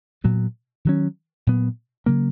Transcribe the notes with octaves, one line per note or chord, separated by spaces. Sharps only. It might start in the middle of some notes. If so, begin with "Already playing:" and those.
A#2 F#3 B3
D#3 F#3 C#4
A#2 F#3 B3
C#3 F#3 A#3